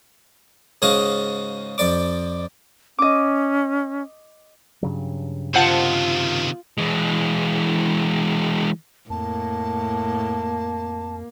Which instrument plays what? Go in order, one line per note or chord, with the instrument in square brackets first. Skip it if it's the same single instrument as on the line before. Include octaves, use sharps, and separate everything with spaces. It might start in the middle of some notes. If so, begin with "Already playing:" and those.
[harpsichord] G#2 C#3 F#4 D#5 F5
F2 D5 D6
[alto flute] C#4 [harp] D#5 D6
[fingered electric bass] G2 C#3 F#3
[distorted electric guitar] C3 D#3 [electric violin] F4 [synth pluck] C5 F#5 A5
[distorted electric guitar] E3 G#3
[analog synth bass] F2 [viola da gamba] A2 [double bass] A#3 [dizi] A5